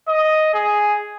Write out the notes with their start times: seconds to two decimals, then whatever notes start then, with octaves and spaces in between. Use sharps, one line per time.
0.08 D#5
0.54 G#4